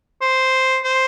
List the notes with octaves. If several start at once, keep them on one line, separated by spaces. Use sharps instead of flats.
C5
C5